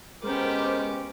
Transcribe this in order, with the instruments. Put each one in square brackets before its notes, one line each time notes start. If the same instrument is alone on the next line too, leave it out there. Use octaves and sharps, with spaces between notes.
[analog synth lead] G#3 [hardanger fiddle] B3 G4 [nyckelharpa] C#4 D6 [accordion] A#4 C5